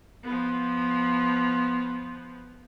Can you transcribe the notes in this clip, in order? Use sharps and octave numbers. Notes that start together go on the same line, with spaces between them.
F3 B3